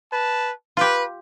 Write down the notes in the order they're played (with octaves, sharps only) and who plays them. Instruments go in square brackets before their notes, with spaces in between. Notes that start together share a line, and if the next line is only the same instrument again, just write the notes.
[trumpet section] B4 A5
[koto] F4 G4 [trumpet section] B4